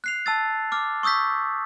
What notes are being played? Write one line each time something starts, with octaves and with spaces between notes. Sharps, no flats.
F#6 C7 F7
A5 E6 A6
D6 F6
C#6 D#6 E6 G6 B6